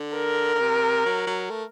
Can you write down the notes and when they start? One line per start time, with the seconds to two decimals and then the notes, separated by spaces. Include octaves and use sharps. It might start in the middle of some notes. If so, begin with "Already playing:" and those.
Already playing: D3
0.15 A#4
0.55 D3
0.60 C3
1.05 F#3
1.27 F#3
1.50 A3